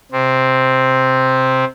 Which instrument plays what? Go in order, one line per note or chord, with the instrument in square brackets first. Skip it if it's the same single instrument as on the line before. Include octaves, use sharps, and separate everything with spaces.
[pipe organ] C3 C4